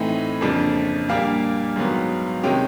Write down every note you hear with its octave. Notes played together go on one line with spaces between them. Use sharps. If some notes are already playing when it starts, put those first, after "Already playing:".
Already playing: A2 E3 A3 C4 D#4
F2 C#3 F3 A#3 D4
A#2 G3 A#3 D4 F5
G#2 D#3 F#3 B3
C3 D#3 G#3 C#4 G5